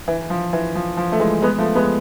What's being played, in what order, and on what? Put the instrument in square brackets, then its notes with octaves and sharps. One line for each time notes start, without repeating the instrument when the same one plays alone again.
[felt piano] E3
F3
E3
F3
F3
A3
E3 G#3
G#3 B3
F3 A3
G#3 B3